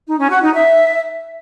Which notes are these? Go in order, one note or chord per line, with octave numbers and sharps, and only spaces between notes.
D#4
C#4
F#4
D#4
E5